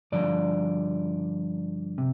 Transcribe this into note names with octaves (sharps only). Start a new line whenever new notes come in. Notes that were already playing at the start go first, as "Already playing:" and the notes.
G2 D3 F3 D5
C3